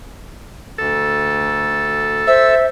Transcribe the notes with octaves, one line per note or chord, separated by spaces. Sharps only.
D2 A4
C5 E5 E6